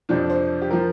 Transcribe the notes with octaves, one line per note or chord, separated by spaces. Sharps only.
F2 C3 F3 D4
C5
G4
F3 A#4